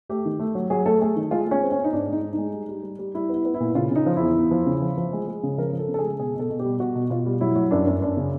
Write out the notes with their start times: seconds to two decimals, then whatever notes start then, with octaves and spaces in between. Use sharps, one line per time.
0.09 A3 G4
0.25 D#3
0.39 A3
0.55 F#3
0.70 F#3 G#4
0.86 A3 A4
1.01 A3 G#4
1.16 D#3
1.31 G#3 F4
1.46 G#3
1.51 C#4
1.62 C4
1.72 C#4
1.78 C4
1.84 D#4
1.93 G#2 D4
2.08 G#3 D#4
2.23 G#2
2.33 G#3 D#4
2.53 G3
2.68 G3
2.83 G3
2.99 G3
3.15 G3 E4
3.29 B3 E4
3.45 B3
3.54 E4
3.60 A#2
3.75 C#3 F4
3.91 C#3 D#4
4.06 F3
4.16 E2 E4
4.36 E2
4.51 F3
4.66 C#3
4.82 F3
4.98 F3
5.13 G#3
5.28 G#3
5.43 C#3
5.58 F3 A#4
5.73 F3
5.79 A4
5.88 C#3
5.94 A4
5.98 G#4
6.04 G#3
6.19 B2 G#4
6.35 B2 A4
6.50 B2
6.59 G4
6.65 G3
6.80 B2 F#4
6.95 B2
7.10 B2 F4
7.26 G3
7.41 F#3 E4
7.55 F#3
7.71 F#2 D4
7.87 F#2
8.02 F#2 D4
8.17 C#3